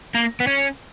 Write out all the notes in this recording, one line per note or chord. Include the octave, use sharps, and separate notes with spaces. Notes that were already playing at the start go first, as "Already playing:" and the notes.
A#3
B3
C#4